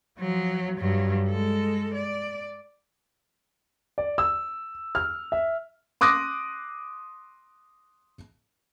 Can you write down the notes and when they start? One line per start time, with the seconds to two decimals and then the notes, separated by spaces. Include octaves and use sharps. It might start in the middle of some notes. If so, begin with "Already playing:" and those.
0.19 F3 F#3
0.78 G2 F#3
1.29 G#3 A4
1.94 D5
3.98 D5
4.18 E6
4.95 F6
5.32 E5
6.01 C6 D6 D#6 F#6 A#6